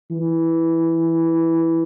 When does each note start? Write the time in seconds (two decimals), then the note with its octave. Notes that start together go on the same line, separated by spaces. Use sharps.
0.11 E3